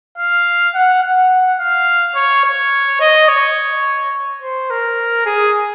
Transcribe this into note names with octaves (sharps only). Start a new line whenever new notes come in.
F5
F#5
F#5
F5
C#5
C#5
D#5
C#5
C5
A#4
G#4